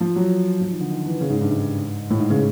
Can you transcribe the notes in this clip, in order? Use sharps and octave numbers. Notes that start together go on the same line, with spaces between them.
F3
F#3
F3
D#3
D3
D#3
E3
C#3
G#2
G2
G#2
A2
G#2
C#3